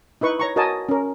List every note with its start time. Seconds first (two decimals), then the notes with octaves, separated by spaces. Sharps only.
0.21 D#4 E4 B4 C#6
0.39 C#5 A#5 C#6
0.56 F#4 A#4 C#5 D#5 G#5 A5
0.89 C#4 A#4